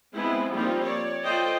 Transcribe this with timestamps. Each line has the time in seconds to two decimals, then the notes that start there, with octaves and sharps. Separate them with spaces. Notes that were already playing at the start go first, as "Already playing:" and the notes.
0.13 G#3 B3 C4 E4 G#4
0.51 F3 G3 A#3 C4 D#4 F4
0.84 C#5 D5
1.22 F4 A4 C5 D5 D#5 G5